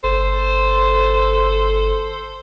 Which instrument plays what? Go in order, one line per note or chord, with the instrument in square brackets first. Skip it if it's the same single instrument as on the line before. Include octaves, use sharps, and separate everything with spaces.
[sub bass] G1 [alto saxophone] A4 [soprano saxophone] C5